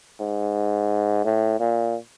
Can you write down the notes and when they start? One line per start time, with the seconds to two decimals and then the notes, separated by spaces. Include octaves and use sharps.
0.20 G#2
1.25 A2
1.59 A#2